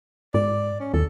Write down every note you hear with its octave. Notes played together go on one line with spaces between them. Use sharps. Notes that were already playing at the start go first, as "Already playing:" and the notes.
G#2 D5
C#4
D#2 A4